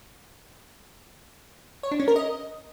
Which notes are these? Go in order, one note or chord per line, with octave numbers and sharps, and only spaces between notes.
C#5
D4
C#4
A#4
D#5